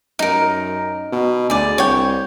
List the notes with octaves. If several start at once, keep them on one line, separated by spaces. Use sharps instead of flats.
F#2 D#4 A#4
B2
D2 G#4 D5
C2 C#5 G5